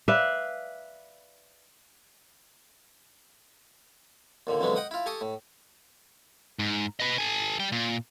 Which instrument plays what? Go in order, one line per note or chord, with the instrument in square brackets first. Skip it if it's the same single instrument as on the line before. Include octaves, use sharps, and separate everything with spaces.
[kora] B4 D5 E5 F5
[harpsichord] D#2 A#2 D3
F2 D3 E3 F#3 G#3 B3
D#5 F#5 G5 D#6
E4 F4
G4 A4 G#5 C#6 D#6
A2
[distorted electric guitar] G#2
B4 D#5
A4 G#5
G3 G5
A#2